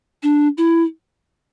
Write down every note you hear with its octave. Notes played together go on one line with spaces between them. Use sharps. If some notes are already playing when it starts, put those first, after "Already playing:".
D4
E4